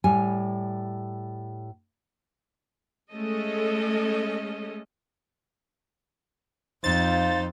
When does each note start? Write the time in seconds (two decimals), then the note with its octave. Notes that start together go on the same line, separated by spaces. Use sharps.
0.04 A2 G3 G#5
3.11 G#3 A3 C#4 A4 D#5
6.84 F2 F3 D#4 F4 C5 A6